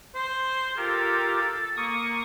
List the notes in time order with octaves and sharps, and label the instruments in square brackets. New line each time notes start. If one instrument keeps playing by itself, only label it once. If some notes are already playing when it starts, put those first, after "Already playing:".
[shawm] C5
[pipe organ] F4 G4 A#4 [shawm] A4
[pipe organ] A#3 C#6 D#6